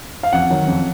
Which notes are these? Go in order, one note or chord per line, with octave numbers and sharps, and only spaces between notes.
F5
F2 F#5
D#3 F#3
F2